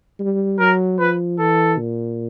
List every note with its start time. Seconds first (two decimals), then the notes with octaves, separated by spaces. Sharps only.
0.20 G3
0.59 F#3 A#4
0.99 F3 B4
1.39 E3 A4
1.79 A#2